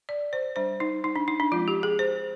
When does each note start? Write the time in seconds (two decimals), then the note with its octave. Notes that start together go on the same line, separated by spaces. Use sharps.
0.09 D5
0.33 C5
0.56 G3 D4 C5
0.80 D#4
1.04 D#4
1.16 D4
1.28 D#4
1.40 D4
1.52 F3 G#3 C4 F4
1.68 G4
1.83 G#4
1.99 C5